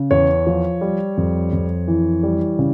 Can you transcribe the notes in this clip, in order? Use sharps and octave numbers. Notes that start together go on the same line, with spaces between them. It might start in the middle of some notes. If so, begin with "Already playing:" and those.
Already playing: C#3
E2 C#5
F3
G3
F2
F2
E3
G3
C#3